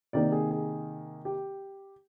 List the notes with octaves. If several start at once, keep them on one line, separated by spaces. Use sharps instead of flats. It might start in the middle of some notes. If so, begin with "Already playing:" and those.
C3 D#3 A#3 D5
G#4
G#4
G4